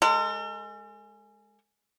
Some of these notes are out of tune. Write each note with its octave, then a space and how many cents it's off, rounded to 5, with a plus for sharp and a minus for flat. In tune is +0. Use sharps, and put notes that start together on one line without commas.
G#3 +0 A4 +45